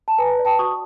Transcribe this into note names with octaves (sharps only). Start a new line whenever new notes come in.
A5
B4 G#5 A#5
D5
G5 A5
F#4 C#6 D#6